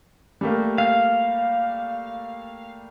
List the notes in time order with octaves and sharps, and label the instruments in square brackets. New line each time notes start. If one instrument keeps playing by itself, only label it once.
[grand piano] G3 A3 A#3
[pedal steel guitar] F5